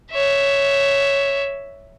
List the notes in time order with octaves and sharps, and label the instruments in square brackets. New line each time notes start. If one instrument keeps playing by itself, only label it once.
[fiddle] C#5 E5